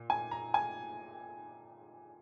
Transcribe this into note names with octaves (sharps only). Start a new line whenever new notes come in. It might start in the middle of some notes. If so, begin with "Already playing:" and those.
Already playing: A#2
G#5
A#5
G#5